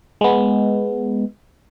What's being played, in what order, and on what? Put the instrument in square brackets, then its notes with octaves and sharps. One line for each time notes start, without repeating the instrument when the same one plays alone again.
[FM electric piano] G#3 B3